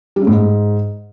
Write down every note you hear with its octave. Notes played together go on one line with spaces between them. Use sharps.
G3
C#3
A2
G#2